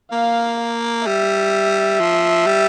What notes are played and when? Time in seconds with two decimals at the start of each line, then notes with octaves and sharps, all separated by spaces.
0.12 A#3 F5
1.05 G3 E5
2.00 F3
2.46 G3